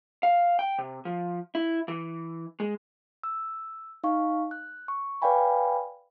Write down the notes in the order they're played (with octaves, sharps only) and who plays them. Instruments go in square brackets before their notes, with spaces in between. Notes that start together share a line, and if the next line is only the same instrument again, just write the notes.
[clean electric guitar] F5
G5
C3
F3
E4
E3
G#3
[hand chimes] E6
D#4 F5 C#6
F#6
C#6
B4 D5 F5 G5 G#5 B5